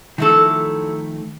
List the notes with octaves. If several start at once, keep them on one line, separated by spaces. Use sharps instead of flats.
D#3 F3 F#3 A3 E4 A4